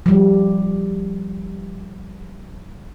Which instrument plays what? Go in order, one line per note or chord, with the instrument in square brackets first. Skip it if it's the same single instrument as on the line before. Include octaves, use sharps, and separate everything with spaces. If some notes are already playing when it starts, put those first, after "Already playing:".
[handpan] F3 G3